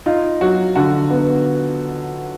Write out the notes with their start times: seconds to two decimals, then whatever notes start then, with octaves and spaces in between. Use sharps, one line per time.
0.06 D#4 F4
0.41 F#3 F#4
0.75 D3 F#4
1.11 B3